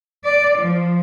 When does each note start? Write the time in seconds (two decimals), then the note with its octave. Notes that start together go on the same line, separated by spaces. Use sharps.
0.24 D5
0.57 F3